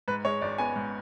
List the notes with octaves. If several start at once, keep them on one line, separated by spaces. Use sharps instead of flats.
G#2 B4
G#3 C#5
G#1 D5
B3 G#5
G#2